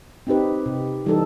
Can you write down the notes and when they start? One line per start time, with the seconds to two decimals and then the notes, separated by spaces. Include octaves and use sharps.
0.27 C4 D#4 G4 B4
0.66 C3
1.06 E3 G3 D#4 A4